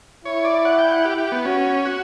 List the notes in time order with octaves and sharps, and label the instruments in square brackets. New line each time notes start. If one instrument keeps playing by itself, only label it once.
[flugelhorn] E4 [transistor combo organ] C#5
[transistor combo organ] D5
F#5
G5
F#5
G4
G4
B3
[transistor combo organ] C#4 [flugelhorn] F#4
[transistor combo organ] F#4